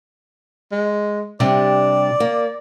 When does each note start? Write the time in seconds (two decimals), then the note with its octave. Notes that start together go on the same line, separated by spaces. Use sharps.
0.72 G#3
1.40 C3 G3 D4 D5
2.20 A#3